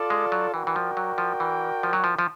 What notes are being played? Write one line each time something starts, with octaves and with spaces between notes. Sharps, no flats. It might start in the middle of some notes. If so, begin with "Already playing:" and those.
Already playing: F4 A4 D5
G#3
F#3
E3 F#4 A#4 D5 G5
E3
F3
F#3
F3
E3
F3
F#3
F3
F3